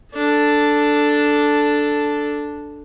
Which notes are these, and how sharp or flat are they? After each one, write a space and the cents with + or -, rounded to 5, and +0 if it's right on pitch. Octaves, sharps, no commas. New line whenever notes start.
D4 +0 A4 +0